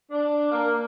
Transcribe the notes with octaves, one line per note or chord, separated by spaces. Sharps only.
D4
A#3